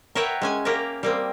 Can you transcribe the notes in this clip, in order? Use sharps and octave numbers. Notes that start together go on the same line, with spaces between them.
A#4 B4 C#5 E5 F#5 G5
G#3 C#4 G#5
A#3 C#4 G4 A#4 A#5
G3 A#3 C4